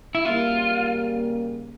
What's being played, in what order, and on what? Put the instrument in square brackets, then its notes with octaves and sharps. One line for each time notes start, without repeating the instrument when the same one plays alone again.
[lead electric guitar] E4
[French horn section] C#3 G3 A#3 [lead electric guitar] F4